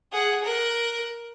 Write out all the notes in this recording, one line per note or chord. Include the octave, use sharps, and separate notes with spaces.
G#4 F#5
A#4 F#6